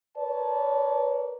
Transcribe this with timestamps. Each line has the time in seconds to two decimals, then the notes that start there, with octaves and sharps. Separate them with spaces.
0.18 A#4 B4 C#5 D5 A5